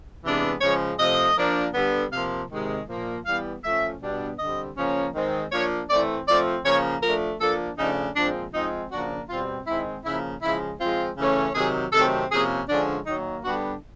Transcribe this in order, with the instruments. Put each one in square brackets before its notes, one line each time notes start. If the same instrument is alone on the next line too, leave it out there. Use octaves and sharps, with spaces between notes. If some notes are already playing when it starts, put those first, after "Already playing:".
[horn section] C3 E3 G#3 B3 D4
C#3 F3 G#3 C#5
C3 F3 A3 C4 D#5
F3 A#3 D4
D3 G3 B3
C3 F3 A#3 F5
C3 D#3 G#3
A#2 F3 A#3
E3 G3 B3 F5
F3 A3 C#4 E5
B2 G3 B3 D4
D3 G3 C4 D#5
C#3 F3 A#3 C#4
D#3 G#3 C4
F3 A#3 D4 C#5
E3 A3 C4 D5
F3 A3 C4 D5
C#3 F3 A#3 C#5
F3 A3 D4 A#4
F3 A#3 D4 A4
C#3 F3 A3 D4 D#4
A#2 F3 G#3 C4 D4
F3 G#3 C4 D#4
C#3 F3 A#3 D4 F#4
B2 G3 C4 F4
D#3 G#3 C4 E4
C#3 F3 A#3 E4
C#3 F3 G#3 E4
F3 G#3 C4 F4
C#3 E3 A3 C#4
C3 D#3 F#3 G#4
C3 D#3 F#3 A3 C4 A4
C3 F3 A#3 C#4 G#4
D3 F3 G#3 C#4 D4
D#3 F#3 A#3 D#4
D3 G3 B3 D4 F#4